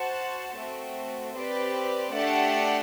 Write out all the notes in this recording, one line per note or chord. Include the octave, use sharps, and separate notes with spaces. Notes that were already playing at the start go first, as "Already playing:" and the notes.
Already playing: F#4 C5 F#5 A5
A3 C4 F#4
C4 G4 B4 D5
A3 D4 G4 D5 F#5